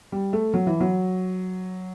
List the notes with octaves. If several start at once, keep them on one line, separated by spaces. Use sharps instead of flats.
G3
A3
F#3
E3
F#3